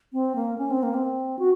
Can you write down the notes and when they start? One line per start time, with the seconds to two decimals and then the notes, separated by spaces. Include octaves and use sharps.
0.13 C4
0.35 A#3
0.58 C#4
0.71 C4
0.83 A#3
0.94 C4
1.39 F#4